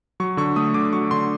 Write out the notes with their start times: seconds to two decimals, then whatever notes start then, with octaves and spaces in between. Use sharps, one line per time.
0.20 F#3 C#6
0.37 D3 C#6
0.56 A3 D#6
0.74 D3 D6
0.93 F#3 C#6
1.11 D3 C6